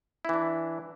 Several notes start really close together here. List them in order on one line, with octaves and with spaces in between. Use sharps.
E4 E3 D4